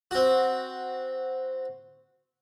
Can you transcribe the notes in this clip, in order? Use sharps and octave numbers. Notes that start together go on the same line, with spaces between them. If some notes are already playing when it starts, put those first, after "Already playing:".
C4 F#4